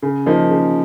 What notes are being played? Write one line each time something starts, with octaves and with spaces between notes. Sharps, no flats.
C#3
F3 A#3 D#4
C#3